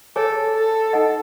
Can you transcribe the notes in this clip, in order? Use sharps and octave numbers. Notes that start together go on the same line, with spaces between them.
G#4 A4 C#5 G#5
A4
D#4 A4 D#5 F#5